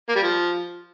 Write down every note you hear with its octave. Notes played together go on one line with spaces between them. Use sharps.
A#3
G3
F3